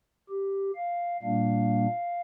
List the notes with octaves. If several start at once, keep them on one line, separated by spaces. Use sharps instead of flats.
G4
F5
A#2 G3 A#3 D4 F5